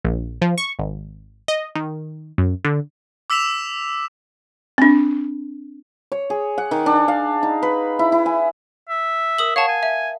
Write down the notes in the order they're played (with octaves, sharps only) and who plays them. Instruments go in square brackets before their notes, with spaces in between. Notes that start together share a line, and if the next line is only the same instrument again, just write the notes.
[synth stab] A#1
F3
C#6
G#1
D#5
D#3
F#2
D3
[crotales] D6 E6 B6 E7 F7
[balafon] C4 D4
[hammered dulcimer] C#5
G#4
F#5
D#3
D4
F5
D#4
B4
E4
E4
G#5
[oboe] E5
[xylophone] A#4 D#6 F#7
[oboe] C#5 [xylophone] F5 F#5 A5
[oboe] G#5
[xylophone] E5